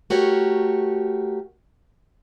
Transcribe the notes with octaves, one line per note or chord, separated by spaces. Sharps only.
A3 F#4 G4 A#4 C#5